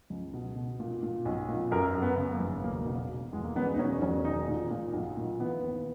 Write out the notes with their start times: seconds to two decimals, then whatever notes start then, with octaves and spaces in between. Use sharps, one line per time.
0.10 C#2
0.34 B2
0.56 B2
0.80 A#2
1.03 A#2
1.25 B1
1.48 A#2
1.71 F#2 A#4
1.95 F#2
2.02 B3
2.17 C#3
2.33 A#3
2.40 G#1
2.64 E1 A#3
2.86 B2
3.09 B2
3.33 E2 G#3
3.44 A#3
3.56 E1 B3
3.74 D#4
3.79 E1 C#4
4.02 E1 C#4
4.25 D#3 D#4
4.48 A#2
4.71 A#2
4.93 B1
5.17 A#2
5.40 E3 B3
5.63 D#2